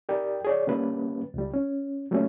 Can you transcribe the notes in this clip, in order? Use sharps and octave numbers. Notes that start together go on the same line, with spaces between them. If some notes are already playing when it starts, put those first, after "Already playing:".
G4 A#4 D5 G5
G#4 C#5 D5
D3 G3 A#3 C#4 G4 B4
C#2 G3
C#4
F#3 G3 A3 A#3 C#4